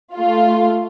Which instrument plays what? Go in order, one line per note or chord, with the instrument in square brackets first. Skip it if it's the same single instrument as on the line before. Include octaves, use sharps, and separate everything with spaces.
[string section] A3 F4